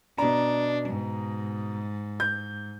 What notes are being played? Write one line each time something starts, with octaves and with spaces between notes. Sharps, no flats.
B2 D4 A#5
G#2
G6